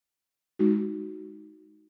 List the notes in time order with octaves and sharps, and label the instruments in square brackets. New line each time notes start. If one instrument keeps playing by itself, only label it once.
[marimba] G#3 D#4 F#4